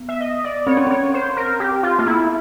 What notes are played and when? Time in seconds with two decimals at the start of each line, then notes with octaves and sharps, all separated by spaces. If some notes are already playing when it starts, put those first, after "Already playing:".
Already playing: B3
0.09 E5
0.20 D#5
0.44 D5
0.67 C4 C#5
0.77 C#4
0.87 C4 C#5
1.14 C5
1.37 A#4
1.60 G4
1.83 F4
1.99 A#3 F4
2.06 B3 E4